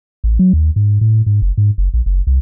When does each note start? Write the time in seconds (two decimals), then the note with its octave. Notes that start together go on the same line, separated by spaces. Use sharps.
0.24 A1
0.39 F#3
0.53 D#2
0.76 G#2
1.01 A2
1.26 G#2
1.42 F#1
1.58 G#2
1.78 F#1
1.94 A#1
2.06 F#1
2.27 C2